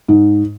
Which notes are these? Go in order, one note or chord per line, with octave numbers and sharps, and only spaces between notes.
G#2